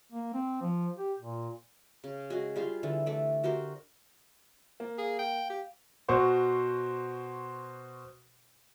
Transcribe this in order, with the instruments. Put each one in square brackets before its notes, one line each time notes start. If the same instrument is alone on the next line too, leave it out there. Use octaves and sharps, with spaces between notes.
[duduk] A#3
C4
F3
G4
A#2
[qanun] C#3
G#3 F#4 G#4
G3 F4 G#4 C5
D3 E3
A3 D5
F#4 G4 A#4 C5
[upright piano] A#3
[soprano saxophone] G#4 [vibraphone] F5
[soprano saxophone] G5
G4
[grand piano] B2 F#4 C5 C#6